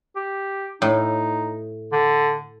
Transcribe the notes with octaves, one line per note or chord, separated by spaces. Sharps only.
G4
A2 D#4
D3